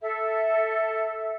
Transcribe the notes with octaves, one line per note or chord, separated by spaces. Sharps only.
A4 E5